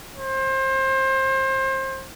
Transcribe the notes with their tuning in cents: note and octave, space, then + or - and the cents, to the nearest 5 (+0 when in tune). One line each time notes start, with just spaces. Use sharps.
C5 +30